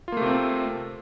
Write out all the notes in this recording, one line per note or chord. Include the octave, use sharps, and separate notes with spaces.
C3 A3 A#3 C4 F4